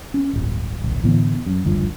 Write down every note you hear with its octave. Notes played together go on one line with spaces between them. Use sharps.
C#4
D1 G1
D1 A#1
A2 D3 E3 B3
F#2
F#1 D2 G2 F3